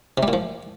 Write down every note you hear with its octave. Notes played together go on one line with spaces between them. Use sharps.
C3
G3
A#2
F3